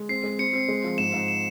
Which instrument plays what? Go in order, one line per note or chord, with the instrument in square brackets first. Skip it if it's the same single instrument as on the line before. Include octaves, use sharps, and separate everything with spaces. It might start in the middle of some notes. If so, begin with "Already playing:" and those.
Already playing: [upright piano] G#3
[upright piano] C4 [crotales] C7
[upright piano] G#3
[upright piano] C4 [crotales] C#7
[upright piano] C4
G#3
F3
[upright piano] G#2 [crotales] E7
[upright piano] G#2
[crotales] E7